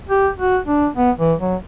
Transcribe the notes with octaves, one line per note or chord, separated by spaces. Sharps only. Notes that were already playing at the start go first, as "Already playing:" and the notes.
G4
F#4
D4
B3
E3
F#3